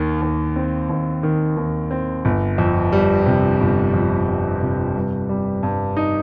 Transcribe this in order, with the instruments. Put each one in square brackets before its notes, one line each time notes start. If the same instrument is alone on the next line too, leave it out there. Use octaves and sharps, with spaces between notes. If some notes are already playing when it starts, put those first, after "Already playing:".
Already playing: [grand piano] D#2 D#3
D#2
C4
D#2
D#3
D#2
C4
G1
F2
G3
C3
G1
F2
G3
C3
G2
G3
G2
D#4